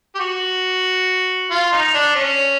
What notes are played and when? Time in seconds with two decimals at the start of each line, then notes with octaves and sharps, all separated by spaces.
0.15 G4
0.20 F#4
1.51 F4
1.72 D#4
1.94 D4
2.15 C#4